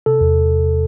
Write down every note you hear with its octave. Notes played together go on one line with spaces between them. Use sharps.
C3 A4
E2